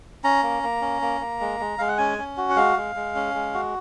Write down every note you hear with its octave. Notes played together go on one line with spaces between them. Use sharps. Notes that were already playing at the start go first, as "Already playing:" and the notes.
C#4 A#5
A#3
A#3
C#4
A#3
A#3
G#3
G#3
G#3 F5
F#5
C#4 G#5
C#4
F#4
F#5
G#3 F5
G#3
G#3
C#4
G#3
F#4